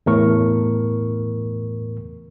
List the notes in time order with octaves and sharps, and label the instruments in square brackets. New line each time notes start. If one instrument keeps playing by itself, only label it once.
[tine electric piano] E2 A2 A#4 C#6